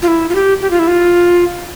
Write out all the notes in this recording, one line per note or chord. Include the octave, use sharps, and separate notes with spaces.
F4
E4
F4
G4
G4
F4
E4
F4